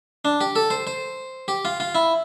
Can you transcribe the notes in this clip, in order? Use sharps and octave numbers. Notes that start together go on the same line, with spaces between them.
D4
G4
A4
C5
C5
G4
F4
F4
E4